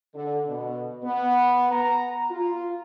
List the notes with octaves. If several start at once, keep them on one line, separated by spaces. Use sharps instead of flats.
D3
B2
B3
A#5
F4